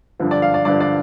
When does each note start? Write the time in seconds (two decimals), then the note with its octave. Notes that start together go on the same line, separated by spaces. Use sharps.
0.20 G2 D3 F3
0.31 D5
0.42 F5
0.54 D5
0.65 G2 D3 F3 D5
0.80 D5